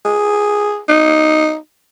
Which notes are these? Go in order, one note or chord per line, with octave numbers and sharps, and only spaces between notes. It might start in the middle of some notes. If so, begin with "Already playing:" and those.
G#4
D#4